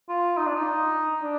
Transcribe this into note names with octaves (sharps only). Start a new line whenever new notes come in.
F4
D#4
D4
D#4
D4